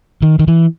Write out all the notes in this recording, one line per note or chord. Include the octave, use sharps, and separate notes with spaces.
D#3
D#3
E3